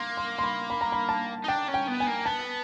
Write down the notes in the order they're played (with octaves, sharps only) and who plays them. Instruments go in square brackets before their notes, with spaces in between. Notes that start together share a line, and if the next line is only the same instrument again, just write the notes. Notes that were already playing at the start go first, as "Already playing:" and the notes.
Already playing: [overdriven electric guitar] A#3 [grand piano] C6
[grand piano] C6
C6
B5
B5
A#5
B5
A5
[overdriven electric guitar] D#4
[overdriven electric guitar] D4 [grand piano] G5
[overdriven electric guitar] C#4
[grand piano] G5
[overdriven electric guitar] B3
[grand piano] G#5
[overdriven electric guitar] A#3
[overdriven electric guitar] B3 [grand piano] A5